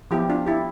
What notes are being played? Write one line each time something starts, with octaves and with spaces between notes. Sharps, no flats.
F3 B3 E4 G4
D4 F4
E4 G4